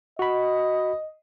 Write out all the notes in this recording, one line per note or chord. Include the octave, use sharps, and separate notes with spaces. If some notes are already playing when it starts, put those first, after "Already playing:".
F#4 D#5 B5